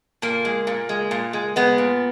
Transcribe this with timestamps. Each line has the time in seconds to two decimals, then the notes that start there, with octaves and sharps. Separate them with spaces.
0.22 A#2 A#3
0.45 G#3
0.67 A#2
0.89 G#3
1.11 A#2
1.33 G#3
1.56 G#3 B3
1.78 A#2